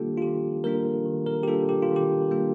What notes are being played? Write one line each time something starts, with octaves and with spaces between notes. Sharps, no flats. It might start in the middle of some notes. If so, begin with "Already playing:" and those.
Already playing: D#3 G3 A#3 D4 F4 G4 A4
F4
D#3 G4
G3 A#3 D4 F4 A#4
D#3
A#4
G4
G3 A#3 D4 F4 A4
G4
F4
D#3
G4
G3 A#3 D4 F4